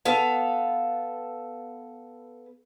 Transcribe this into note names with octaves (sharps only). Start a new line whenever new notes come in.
B3 A4 F5